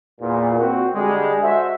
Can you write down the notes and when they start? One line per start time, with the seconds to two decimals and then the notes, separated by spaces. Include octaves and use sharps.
0.21 E2 A#2
0.59 C4 F#4
0.94 D3 G3 G#3
1.42 F#4 A4 C5 D#5 E5